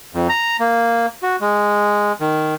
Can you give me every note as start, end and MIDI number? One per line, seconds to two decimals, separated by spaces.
0.15 0.27 41
0.29 0.57 82
0.60 1.06 58
1.23 1.36 66
1.41 2.13 56
2.20 2.55 51